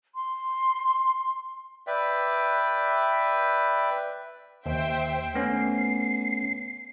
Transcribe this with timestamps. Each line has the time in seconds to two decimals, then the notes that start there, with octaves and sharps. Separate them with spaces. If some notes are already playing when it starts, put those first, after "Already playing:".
0.15 C6
1.87 B4 D5 E5 G5
4.66 D#2 C5 E5 G5
5.34 A3 B3 C#4 C7